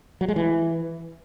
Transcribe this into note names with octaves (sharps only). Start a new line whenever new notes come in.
F#3
G#3
E3